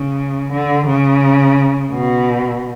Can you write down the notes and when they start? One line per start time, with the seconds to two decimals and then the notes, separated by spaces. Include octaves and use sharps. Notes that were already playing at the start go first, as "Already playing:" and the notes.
Already playing: C#3
0.52 D3
0.87 C#3
1.92 B2